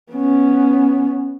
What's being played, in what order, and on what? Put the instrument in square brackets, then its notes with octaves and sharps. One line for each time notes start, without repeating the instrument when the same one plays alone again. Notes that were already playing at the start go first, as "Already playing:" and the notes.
[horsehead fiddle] B3 C#4